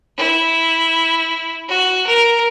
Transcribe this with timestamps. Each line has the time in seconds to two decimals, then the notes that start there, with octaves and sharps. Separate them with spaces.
0.17 E4
1.68 F#4
2.06 A#4